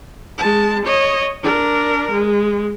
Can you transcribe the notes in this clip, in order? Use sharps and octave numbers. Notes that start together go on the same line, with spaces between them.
G#3 A5
C#5 D#5
D4 A#4
G#3